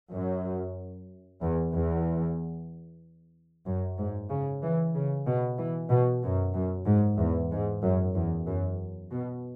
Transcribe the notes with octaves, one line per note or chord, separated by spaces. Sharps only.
F#2
E2
E2
F#2
G#2
C#3
E3
C#3
B2
E3
B2
F#2
F#2
G#2
E2
G#2
F#2
E2
F#2
B2